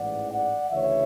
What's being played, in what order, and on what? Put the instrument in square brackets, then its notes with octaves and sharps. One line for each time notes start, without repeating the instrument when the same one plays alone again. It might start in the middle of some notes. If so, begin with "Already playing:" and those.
Already playing: [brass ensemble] A1 G#2 E3 D5 F#5
D5 F#5
D2 C#3 E3 C#5 E5